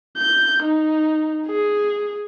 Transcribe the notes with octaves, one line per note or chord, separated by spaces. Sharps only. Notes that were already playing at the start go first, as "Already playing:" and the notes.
G6
D#4
G#4